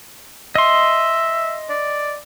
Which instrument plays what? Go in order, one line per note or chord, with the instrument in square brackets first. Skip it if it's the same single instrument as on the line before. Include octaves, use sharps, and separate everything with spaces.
[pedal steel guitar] D#5 C6 [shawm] E5
[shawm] D5